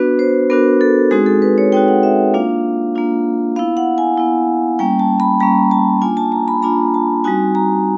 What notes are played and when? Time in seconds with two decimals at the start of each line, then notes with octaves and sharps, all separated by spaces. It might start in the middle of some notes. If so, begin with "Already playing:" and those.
Already playing: B3 D4 F#4 B4
0.19 C5
0.50 B3 D4 F#4 A#4
0.81 A4
1.11 G#3 C4 D#4 F#4 G#4
1.26 A4
1.42 B4
1.58 C#5
1.72 G#3 C4 D#4 F#4 G5
1.88 F#5
2.03 E5
2.34 A#3 D4 F4 F5
2.95 A#3 D4 F4
3.56 B3 E4 F5
3.77 F#5
3.98 G#5
4.18 B3 E4
4.79 G3 A#3 C#4 G5
4.99 A5
5.20 B5
5.40 G3 A#3 C#4 A#5
5.71 A5
6.02 A#3 D4 F4 G#5
6.17 A5
6.32 A#5
6.48 B5
6.63 A#3 D4 F4 A#5
6.94 A5
7.24 G3 C4 D#4 F#4 G#5
7.55 A#5